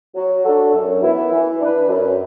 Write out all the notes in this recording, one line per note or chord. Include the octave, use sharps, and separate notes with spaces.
F#3
D4 F#4 A4
F#2
E3 B3 E4
E3
D4 B4
F#2